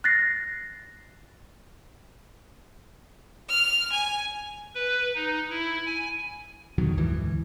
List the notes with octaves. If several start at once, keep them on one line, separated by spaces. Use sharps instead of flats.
F#6 A6 A#6 C7
F6
G#5
B4
D#4
E4
G#5
F2 B2 D#3 F#3
D2 G#2 E3